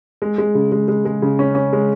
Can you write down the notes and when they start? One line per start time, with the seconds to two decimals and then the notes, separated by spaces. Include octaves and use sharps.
0.22 G#3
0.38 G#3
0.55 C#3
0.72 G#3
0.88 G#3
1.05 G#3
1.22 C#3
1.39 C#4
1.55 C#4
1.73 G#3